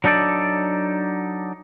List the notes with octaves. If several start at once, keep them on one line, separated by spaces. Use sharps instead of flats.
F#3 D4 D#4 A4 D5